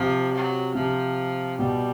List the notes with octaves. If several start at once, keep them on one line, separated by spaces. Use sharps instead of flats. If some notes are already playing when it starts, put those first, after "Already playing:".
Already playing: C3 F3
F#3
C3 F3
B2 G3